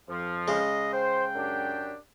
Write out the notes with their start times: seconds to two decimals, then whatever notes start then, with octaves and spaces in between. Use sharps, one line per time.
0.08 F2 F3
0.48 C#3 G#3 D#5
0.93 C5 G5
1.35 F#2 D4 G4